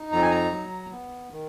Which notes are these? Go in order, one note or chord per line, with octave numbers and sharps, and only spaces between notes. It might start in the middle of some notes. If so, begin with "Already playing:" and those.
Already playing: D#4
F2 A#5
G#5
A#5
F#3
B3
D#3